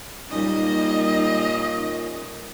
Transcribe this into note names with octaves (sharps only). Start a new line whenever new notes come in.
A#2 G3 A#3 C#4 D#4 D#5